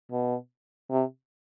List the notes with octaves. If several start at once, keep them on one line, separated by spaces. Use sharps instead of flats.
B2
C3